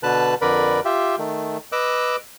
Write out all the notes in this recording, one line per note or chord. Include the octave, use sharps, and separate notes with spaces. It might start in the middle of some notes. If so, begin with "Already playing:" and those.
B2 D3 B4 A5 F#6
F2 D3 A#4 B4 D5 B5
F4 G4 E5
D#3 A3
B4 D#5 D6 E6 F#6